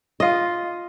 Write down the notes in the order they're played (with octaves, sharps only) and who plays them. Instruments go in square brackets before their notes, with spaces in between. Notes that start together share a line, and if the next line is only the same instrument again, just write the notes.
[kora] F4 D#5